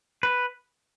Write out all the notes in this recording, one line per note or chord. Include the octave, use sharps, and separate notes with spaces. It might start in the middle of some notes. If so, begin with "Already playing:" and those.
B4